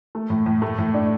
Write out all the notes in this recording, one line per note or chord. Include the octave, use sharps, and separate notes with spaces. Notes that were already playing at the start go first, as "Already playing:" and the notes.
A3
A2
A2
A3
A2
D4